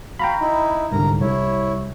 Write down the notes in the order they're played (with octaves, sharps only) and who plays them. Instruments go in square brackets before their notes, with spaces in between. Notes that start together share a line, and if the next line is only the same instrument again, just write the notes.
[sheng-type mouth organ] F#4 F5 [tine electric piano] G5 A#5 B5
[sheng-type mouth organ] D#4 E4
[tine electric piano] C2 G#2 D3 [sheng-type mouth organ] A#4 A#5
[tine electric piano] C2 [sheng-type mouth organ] E4 C#5